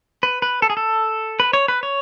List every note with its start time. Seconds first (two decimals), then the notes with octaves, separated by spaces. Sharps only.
0.23 B4
0.42 B4
0.62 A4
0.70 G#4
0.77 A4
1.40 B4
1.53 C#5
1.68 B4
1.83 C#5